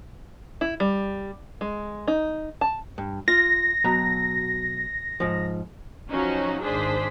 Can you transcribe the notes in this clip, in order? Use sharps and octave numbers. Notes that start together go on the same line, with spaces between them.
E4
G3
G#3
D#4
A5
G2
F4 F5 A#6
B2 F#3 A#5
G#2 F3
F3 F#3 C#4 D#4 F#4
G#1 D4 G#4 C5 B6